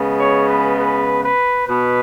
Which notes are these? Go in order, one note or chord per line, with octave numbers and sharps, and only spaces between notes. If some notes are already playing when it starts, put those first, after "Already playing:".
Already playing: C#3 G#3 B3
C#5
B4
B4
B4
B2 B4